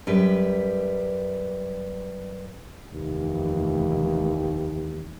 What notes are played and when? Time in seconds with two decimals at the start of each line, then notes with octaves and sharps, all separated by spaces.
0.07 F#2 G3 B4
2.94 F1 D#2 E3